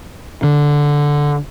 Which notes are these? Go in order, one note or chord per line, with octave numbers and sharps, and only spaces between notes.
D3